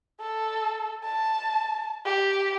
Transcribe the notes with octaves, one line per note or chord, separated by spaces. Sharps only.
A4
A5
G4